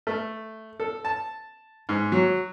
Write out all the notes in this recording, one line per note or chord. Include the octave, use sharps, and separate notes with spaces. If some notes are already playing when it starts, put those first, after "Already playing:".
A3
A4
A5
G#2
F#3